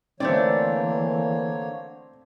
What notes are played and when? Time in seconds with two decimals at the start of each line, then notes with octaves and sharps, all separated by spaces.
0.20 D3 E3 A3 A#3 C4 D4 C#5 D5